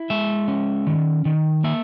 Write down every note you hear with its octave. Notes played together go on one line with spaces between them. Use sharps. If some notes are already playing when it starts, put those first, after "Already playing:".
Already playing: E4
G#3 E5
C#4
D#3
D#3
A#3 E5